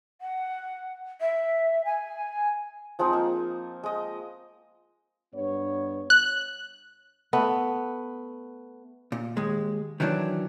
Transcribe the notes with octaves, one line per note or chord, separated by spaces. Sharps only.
F#5
E5
G#5
F3 G#3 C4 D#4
A#3
G#3 D#5
G2 B3 C#5
F#6
A3 B3
A#2
D#2 G#3
D#3 E3 F#3 D4